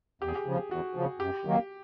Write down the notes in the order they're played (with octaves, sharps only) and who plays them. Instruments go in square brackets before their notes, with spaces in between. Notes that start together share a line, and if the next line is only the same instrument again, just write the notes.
[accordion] E2 [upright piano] G4
[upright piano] G#4
G4
[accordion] C#3 F3
[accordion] E2 [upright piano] F#4
[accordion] C#3 F3
[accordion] F#2 [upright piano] G4
[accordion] D#3 F#3 A#3